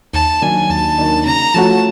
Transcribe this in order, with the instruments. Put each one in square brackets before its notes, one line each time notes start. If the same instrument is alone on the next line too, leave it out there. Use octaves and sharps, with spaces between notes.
[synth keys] D#2 [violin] A5
[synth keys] D#3 F#3 A#3 D4 [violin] G#5
[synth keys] D#2 [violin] A5
[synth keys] D#3 F#3 A#3 D4
[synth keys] C#3 [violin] A#5
[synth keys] F3 A3 C#4 F#4 [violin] A5